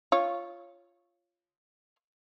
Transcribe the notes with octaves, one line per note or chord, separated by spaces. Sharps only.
F4 C#5